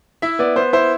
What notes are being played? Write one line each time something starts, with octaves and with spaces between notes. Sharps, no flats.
E4 E5
B3 D5
B3 C5
E4 C5